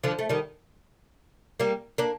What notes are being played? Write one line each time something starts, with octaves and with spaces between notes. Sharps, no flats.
D3 F3
A3
D#3 G3
G3 A#3
A#3 D4